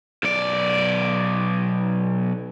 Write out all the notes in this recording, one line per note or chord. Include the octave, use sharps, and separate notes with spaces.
B1 D5